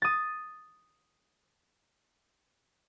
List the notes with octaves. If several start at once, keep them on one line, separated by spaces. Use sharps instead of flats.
D#6 A6